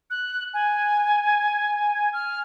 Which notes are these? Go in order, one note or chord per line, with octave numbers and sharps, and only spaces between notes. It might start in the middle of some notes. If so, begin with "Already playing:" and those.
F#6
G#5
F6